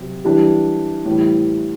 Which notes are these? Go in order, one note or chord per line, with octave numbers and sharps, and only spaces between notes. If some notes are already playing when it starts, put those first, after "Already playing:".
Already playing: C3 F#3
E3 G3 D4 G4
A2 E3 G3